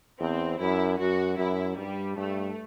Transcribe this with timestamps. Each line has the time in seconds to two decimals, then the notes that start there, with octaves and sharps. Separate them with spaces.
0.20 E2 C4
0.59 F#2 E4
0.99 F#2 F#4
1.38 F#2 E4
1.77 G2 G3
2.17 G2 A3